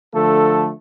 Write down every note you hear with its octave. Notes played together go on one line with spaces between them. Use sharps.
D3 F3 A3 A4